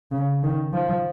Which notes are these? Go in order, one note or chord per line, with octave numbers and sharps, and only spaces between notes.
C#3
D#3
F3